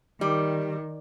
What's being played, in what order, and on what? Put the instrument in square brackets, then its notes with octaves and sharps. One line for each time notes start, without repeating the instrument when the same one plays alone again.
[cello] D#3 [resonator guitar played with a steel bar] G3